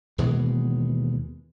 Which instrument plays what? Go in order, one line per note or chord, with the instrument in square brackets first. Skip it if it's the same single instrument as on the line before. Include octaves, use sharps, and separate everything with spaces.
[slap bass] D#2 B2 E3 G#3